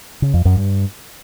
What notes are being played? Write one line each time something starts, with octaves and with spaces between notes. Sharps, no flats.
C#3
F2
F#2
G2